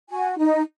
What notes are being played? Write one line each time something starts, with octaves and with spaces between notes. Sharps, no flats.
F#4 G#5
D#4